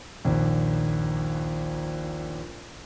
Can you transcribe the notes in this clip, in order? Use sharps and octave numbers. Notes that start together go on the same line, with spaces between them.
A#1 D#2